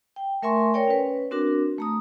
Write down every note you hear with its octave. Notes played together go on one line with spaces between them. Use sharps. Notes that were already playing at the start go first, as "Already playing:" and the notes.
G5
A3 A#4 E5 G#5 C6 C#6
A#4 C#5 D5 G5
C#4 B4
C4 D4 F#4 A#4 D6
A3 A#5 D#6